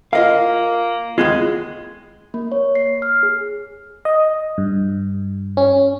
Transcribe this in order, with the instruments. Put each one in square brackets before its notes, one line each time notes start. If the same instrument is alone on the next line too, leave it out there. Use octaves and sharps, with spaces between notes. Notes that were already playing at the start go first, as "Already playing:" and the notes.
[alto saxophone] A#3 [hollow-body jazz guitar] F4 D#5 F5
[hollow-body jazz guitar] D#2 B3 F4 [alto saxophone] G#3
[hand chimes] A#3
C#5
C7
F6
G#4
[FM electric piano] D#5
G2
C#4